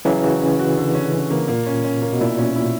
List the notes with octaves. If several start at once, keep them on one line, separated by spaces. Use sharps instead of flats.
C#3 E3 F#3
F#4
C#4
F#4
D3
C#4
C#4
A#3
A#2 A#3
C#4
C#4
A#3
B2
A#2 E4
C#4
E4